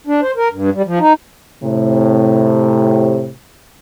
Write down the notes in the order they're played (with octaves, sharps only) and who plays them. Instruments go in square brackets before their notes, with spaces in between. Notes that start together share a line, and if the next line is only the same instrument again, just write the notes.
[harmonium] D4
C5
A#4
G2
G3
F3
D#4
[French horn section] A2 C3